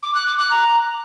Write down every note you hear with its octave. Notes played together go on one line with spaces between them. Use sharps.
D6
F#6
D6
F#6
A#5